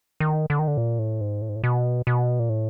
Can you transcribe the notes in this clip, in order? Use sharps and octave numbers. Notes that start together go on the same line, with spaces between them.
D#3
D3
D#3
D3
A#2
A2
G#2
A2
G#2
A2
B2
B2
A#2
A2